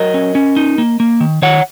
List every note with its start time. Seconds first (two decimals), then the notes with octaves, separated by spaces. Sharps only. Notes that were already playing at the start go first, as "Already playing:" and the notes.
Already playing: F#3 A#4 D#5
0.14 C#4
0.35 C#4
0.56 D#4
0.78 A#3
1.00 A#3
1.20 D#3
1.42 D#3 C#5 F#5